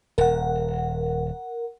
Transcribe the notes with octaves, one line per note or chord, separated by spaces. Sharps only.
D#1 A#4 F#5